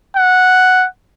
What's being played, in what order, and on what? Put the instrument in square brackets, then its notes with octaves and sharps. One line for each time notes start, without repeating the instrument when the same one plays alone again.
[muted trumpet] F#5